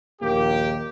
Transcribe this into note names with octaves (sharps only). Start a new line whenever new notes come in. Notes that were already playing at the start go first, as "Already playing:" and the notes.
A#1 D#2 A#3 G4